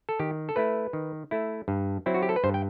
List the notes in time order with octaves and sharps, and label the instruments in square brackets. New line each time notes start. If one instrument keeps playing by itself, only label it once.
[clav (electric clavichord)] A4
D#3 G4
A4
A3 E4 B4
D#3
A3 E4
G2
F#3 C4 E4
F#4
G4
A4
B4
G2 C5
G5